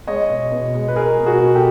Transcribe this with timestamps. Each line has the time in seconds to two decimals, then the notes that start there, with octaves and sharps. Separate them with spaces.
0.07 G#3 C#5 D#5
0.29 B2
0.51 B2
0.74 G#3
0.88 B4
0.96 G#3 G#4 A#4
1.19 B2
1.26 F#4 G#4
1.40 B2
1.55 G4 A4